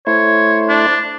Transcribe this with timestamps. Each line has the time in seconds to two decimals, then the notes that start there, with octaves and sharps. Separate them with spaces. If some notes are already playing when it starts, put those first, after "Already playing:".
0.07 A3 E4 C5 C#5
0.68 D4